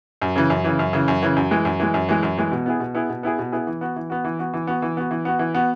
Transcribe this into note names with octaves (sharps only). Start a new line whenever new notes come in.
F#2
C#3 E3
F#2
C#3 E3
F#2
C#3 E3
F#2
C#3 E3
F#2
E3 G#3
F#2
E3 G#3
F#2
E3 G#3
F#2
E3 G#3
B2
B3 E4 G#4
B2
B3 E4 G#4
B2
B3 E4 G#4
B2
B3 E4 G#4
E3
B3 F#4
E3
B3 F#4
E3
B3 F#4
E3
B3 F#4
E3
B3 F#4
E3
B3 F#4
E3
B3 F#4